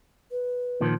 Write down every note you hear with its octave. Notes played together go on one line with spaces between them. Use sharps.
B4
A#2 D#3 F3